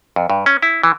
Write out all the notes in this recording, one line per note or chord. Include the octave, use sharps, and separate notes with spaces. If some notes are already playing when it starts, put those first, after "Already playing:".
F2
G2
C#4
E4
E3